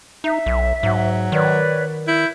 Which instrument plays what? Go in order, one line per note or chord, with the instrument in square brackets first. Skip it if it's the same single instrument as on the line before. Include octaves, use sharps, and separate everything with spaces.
[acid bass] D#4 [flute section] E5
[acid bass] B1
[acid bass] G#2 [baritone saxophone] F#3
[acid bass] D#3 [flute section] B4 C#5 D5
[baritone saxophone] E4 [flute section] G6